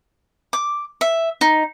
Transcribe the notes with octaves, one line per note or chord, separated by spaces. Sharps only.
D6
E5
D#4